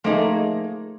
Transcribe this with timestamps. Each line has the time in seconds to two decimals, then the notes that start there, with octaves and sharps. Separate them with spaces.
0.04 F3 A3 A#3 D#4 G#4